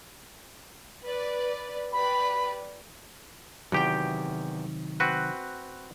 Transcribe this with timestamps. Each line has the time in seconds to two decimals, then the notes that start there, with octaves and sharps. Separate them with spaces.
1.04 B4 D5
1.92 G4 B4 D5 B5
3.72 E2 C3 D#3 F#3 G4 G5
5.00 C4 F#4 B4